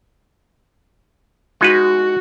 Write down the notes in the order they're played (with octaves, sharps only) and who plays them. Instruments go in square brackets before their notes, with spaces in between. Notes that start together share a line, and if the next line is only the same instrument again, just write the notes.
[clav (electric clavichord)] G#3 D#4 B4 [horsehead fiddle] F#4